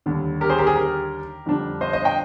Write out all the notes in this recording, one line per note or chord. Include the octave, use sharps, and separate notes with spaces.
D#2 D3 G3
G4 A#4
G#4 C5
G4 A#4
G#4
G4 A#4
F2 D3 G3 D4
C5 D#5
C5 D#5
D#5 G5